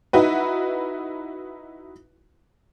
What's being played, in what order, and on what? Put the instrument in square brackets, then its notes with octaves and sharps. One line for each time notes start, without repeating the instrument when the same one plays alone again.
[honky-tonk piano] D#4 E4 F#4 B4